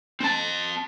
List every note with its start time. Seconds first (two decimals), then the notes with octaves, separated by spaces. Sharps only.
0.20 C4 A5